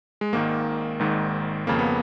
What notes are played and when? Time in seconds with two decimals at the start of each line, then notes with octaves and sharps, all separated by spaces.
0.21 G#3
0.33 G#1 G#2 D#3 A#3
0.99 G#1 G#2 D#3
1.67 F2 C#3 A#3
1.79 B3